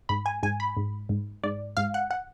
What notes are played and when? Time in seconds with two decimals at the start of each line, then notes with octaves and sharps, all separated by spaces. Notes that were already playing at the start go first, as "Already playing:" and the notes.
0.09 G#2 B5
0.26 G#5
0.43 G#2 G#5
0.60 B5
0.77 G#2
1.09 G#2
1.43 G#2 D5
1.77 G#2 F5
1.94 F#5
2.11 F#5